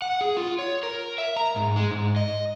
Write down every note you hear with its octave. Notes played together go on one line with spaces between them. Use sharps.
F#5
G#4
F4
C#5
A#4
E5
A#5
G#2
G#3
G#2
D#5